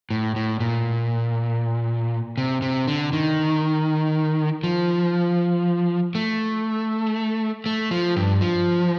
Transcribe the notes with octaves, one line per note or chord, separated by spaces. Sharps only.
A2
A2
A#2
C3
C3
D3
D#3
F3
A3
A3
F3
G2
F3